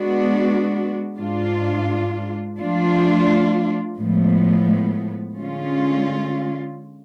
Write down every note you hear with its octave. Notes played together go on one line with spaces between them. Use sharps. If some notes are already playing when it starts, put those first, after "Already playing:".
Already playing: G#3 B3 D4 F#4
G#2 G#3 D4 F4
F3 A3 D4 F4
A2 F3 G#3 B3
D3 G#3 C#4 F4